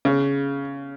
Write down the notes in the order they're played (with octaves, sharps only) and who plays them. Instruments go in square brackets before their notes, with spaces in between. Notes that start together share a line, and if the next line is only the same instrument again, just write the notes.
[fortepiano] C#3